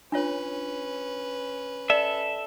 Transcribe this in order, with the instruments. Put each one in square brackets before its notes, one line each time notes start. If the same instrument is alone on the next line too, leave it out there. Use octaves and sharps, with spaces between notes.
[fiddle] C#4 B4 [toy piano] D4 F4 C#5
[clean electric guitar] A4 E5 [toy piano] D5